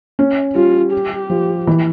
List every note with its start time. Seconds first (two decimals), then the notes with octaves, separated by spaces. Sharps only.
0.19 C#4
0.55 G3 F4
0.92 G4
1.30 F3
1.67 E3